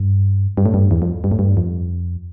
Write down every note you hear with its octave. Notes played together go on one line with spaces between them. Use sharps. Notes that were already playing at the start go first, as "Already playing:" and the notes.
Already playing: G2
G2
A2
G2
E2
F2
G2
A2
G2
F2